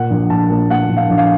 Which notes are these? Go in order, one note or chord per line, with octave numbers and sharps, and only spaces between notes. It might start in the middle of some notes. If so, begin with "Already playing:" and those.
Already playing: A#2 F#5
A#1
A#1 A5
A#2
A#2 F#5
A#1
F5
A#1
F5